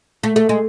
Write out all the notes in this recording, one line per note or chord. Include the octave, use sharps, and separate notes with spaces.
A3
A3
G#3